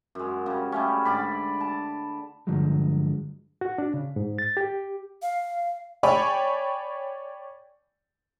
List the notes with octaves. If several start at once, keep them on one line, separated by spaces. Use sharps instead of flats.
F#2 G#3
C#3 G3
G3 A3 C#4
G#2 D3 D5 B5
A5
G2 D3 F3 F#3 G#3
F#4
D4
C#3
G#2
A6
G4
F5
C#5 D5 G5 G#5 B5 C#6